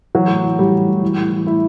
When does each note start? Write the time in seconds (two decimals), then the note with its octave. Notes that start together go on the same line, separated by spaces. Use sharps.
0.15 E3 F#3
0.28 A2
0.44 E3
0.58 A2 G3
0.73 E3
0.88 A2
1.02 E3
1.17 A2
1.32 E3
1.46 A2 E4